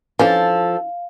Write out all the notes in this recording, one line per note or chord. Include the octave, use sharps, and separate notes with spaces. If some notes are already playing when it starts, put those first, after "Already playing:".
E3 F3 C#4 D4 A4 F5